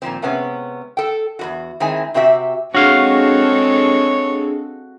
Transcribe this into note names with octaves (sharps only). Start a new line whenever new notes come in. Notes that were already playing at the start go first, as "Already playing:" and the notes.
A#2 D#3 F3 C4
C3 G#3 B3 C#4
A4 G5
E2 G#2 F#4
D#3 G#3 C4 E4 G#5
C3 C4 F#4 G4 E5
G#3 C4 D4 F#4 G#4 A4 C#5 F5